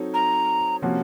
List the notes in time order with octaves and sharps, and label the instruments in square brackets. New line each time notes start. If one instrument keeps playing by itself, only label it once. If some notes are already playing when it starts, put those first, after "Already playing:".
Already playing: [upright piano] F#3 C4 D#4 A4 C#5
[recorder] A#5
[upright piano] C3 F3 A#3 C#4 F#4